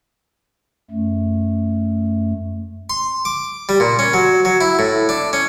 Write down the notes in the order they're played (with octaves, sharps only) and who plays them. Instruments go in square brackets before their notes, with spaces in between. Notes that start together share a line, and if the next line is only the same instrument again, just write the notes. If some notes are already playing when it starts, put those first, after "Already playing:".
[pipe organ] F#2 A3
[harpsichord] C6
D6
G3
A#2
C#4
F#3
F#3
E4
A2
D4
C#4